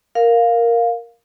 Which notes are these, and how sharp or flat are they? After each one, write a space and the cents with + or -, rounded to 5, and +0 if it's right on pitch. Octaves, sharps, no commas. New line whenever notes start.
A#4 +0 F5 +5